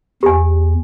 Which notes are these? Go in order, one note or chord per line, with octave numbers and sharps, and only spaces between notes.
E2 G4 G#5